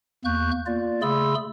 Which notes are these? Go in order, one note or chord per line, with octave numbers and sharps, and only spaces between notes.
E2 A#3 C#6 F#6 G6
A#3 F4 D5
C#3 A3 G#4 B5 C6 E6